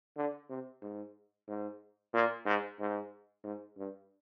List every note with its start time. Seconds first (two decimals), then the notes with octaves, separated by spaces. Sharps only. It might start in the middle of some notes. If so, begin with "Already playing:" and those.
0.16 D3
0.50 C3
0.82 G#2
1.48 G#2
2.14 A#2
2.46 G#2
2.80 G#2
3.44 G#2
3.77 G2